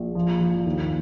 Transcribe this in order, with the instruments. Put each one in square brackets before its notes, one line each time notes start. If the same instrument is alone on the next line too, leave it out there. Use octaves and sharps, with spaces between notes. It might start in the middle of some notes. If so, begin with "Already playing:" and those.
Already playing: [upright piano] A#1
F3
F3
D#2